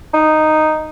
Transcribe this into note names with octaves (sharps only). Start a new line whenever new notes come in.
D#4